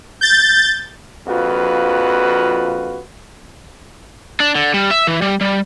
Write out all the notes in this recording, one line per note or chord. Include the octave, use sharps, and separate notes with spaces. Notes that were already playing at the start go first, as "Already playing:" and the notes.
G6 A6
A#1 F2 F4 F#4 B4
D4
D3
G3
E5
E3
G3
G3